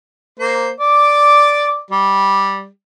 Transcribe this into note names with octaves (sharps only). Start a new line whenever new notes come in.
A#3 C5
D5 D6
G3